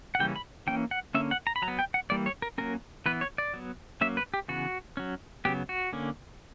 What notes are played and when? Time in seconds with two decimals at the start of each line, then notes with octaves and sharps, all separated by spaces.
0.15 F#5
0.19 C#3 E3 G3 A#3 C#4 G5
0.36 B5
0.67 E3 A#3 C#4 G5
0.91 F#5
1.15 D3 A#3 C#4 E5
1.31 F#5
1.47 A#5
1.56 B5
1.62 F#3 A#5
1.68 B3
1.79 G5
1.94 F#5
2.10 E3 G3 A#3 D5
2.26 C#5
2.42 A#4
2.58 F#3 A#3 C#4 A#4
3.06 E3 B3 B4
3.21 C#5
3.38 D5
3.54 F#3 B3
4.01 F#3 A#3 C#4 E5
4.17 B4
4.34 G4
4.48 C#3 E3 B3 F#4
4.97 F#3 C#4
5.45 C#3 F#3 B3 G4
5.69 F#4
5.93 D3 A#3 C#4